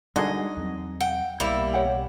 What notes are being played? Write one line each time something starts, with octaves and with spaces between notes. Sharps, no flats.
D3 G3 G#3 D#4 F#4 G#4 A#4 D#5
E2 F#3 C4
F#5 G5
B1 B2 G3 A#3 E4
C#5 F#5 G5